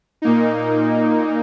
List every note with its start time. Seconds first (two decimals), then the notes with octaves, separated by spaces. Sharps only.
0.22 A#2 A#3 D#4